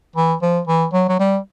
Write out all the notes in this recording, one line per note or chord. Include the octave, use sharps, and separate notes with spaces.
E3
F3
E3
F#3
F#3
G3